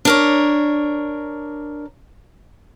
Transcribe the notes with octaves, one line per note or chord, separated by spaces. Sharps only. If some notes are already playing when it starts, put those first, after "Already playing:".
D4 A#4 C#5